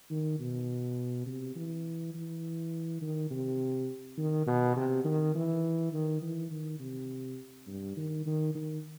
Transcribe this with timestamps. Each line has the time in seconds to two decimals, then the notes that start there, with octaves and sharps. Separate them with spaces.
0.10 D#3
0.39 B2
1.26 C3
1.56 E3
2.14 E3
3.01 D#3
3.30 C3
4.18 D#3
4.47 B2
4.76 C3
5.04 D#3
5.35 E3
5.93 D#3
6.22 E3
6.51 D#3
6.80 C3
7.67 G2
7.96 D#3
8.26 D#3
8.55 D#3